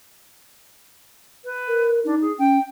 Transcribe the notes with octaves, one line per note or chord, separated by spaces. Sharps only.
B4
A#4
D4 D#4
G#4
C#4 G5